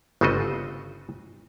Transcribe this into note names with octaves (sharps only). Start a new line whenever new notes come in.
G1 C#3 A3 C4 F#4 D#5